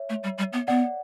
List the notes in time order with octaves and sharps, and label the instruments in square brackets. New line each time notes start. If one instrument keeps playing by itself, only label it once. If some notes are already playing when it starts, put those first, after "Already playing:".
Already playing: [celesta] C#5 E5
[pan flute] A3
G3
G3
B3
[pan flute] B3 [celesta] D5 F#5